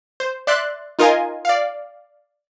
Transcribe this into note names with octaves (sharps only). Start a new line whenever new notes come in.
C5
D5 E5 C6 F#6 A6
D#4 F4 A#4 D#5 F5 G#5
D5 F5